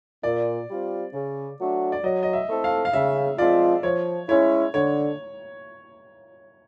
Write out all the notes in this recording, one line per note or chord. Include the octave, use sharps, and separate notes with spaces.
A#2 D5
G3 C4 F4
C#3
F#3 A3 D4 F#4
D5
F#3 D#5
D#5
E5
A3 C4 E4 A4
F5
F5
C#3 E5
F3 G#3 C4 F4 D5
F3 C#5
G#3 C#4 E4 C#5
D3 C#5